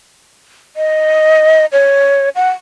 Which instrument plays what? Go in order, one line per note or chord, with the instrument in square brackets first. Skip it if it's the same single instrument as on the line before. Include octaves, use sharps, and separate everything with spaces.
[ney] D#5
C#5
F#5